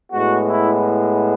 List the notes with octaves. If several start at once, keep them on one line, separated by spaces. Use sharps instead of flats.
A2 G#3 B3 F#4
E4